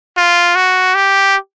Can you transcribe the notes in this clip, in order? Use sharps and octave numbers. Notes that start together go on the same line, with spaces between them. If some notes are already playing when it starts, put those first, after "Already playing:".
F4
F#4
G4